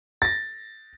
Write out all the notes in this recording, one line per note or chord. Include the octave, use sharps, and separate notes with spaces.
A6 A#6